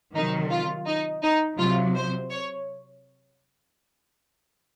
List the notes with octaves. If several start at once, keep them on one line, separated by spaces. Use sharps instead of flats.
C3 D#3 F#3 D#4
F4
D#4
D#4
C3 F#3 F4
C5
C#5